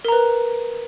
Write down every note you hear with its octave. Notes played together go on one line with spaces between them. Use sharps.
A#4 B4 A#5